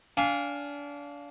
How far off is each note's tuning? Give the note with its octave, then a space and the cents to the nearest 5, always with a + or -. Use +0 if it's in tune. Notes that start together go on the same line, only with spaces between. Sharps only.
D4 -30 F5 +0 G#5 -20